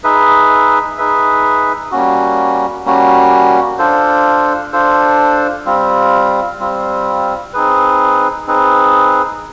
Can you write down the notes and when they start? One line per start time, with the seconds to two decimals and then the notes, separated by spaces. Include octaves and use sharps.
0.04 D#4 G#4 B4 E5
0.98 D#4 G#4 B4 E5
1.91 G3 A#3 C#4 F#4
2.85 G3 A#3 C#4 F#4
3.78 D4 F4 A4 C5
4.73 D4 F4 A4 C5
5.66 G3 C4 F4
6.59 G3 C4 F4
7.53 C4 D#4 G#4 B4
8.47 C4 D#4 G#4 B4